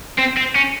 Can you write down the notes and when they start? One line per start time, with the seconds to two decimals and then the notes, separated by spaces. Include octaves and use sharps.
0.19 C4
0.37 C4
0.55 C#4